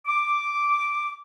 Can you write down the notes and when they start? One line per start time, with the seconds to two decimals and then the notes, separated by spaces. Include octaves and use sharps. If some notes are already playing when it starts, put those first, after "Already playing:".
0.06 D6